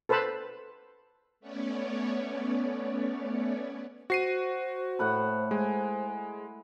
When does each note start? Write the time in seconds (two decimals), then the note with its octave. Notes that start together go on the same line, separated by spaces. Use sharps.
0.09 A4 B4 C5 A5 B5
1.40 A3 B3 C#4 C#5 D5
4.10 F#4 C5 C7 D#7
4.99 A2 F#5 B5
5.51 G#3 G#5